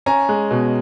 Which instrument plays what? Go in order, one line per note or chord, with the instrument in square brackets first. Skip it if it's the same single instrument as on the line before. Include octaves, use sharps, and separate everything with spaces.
[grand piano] C#4 G#5 A#5
G#3
B2